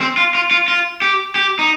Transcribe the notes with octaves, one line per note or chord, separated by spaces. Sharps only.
C4
F4
F4
F4
F4
G4
G4
D#4